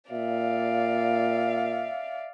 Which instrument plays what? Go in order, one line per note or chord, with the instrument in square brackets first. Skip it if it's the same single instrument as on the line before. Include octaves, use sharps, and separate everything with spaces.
[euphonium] A#2 [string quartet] D5 F5 [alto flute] E5